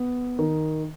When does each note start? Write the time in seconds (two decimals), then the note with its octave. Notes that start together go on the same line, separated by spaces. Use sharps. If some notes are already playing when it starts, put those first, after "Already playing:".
Already playing: B3
0.39 D#3